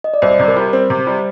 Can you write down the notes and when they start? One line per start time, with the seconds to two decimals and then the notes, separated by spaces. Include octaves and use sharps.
0.04 D#5
0.14 D5
0.22 C2 C5
0.40 C3
0.48 A#4
0.56 G3
0.73 C4 C5
0.90 C3
1.07 G3